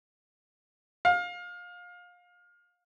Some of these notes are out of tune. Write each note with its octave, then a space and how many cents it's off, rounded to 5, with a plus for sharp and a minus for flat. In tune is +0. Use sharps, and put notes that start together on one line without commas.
F5 +25